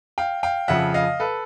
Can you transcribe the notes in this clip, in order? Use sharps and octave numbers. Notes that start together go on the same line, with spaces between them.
F5 G5
F5 G5
F2 C#3 F3 E5 F#5
D#5 F5
A4 B4